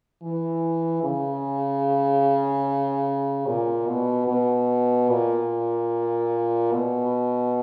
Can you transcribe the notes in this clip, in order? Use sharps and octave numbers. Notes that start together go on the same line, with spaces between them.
E3
C#3
A#2
B2
B2
A#2
B2